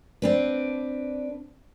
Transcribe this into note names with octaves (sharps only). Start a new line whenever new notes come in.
C4 D4 B4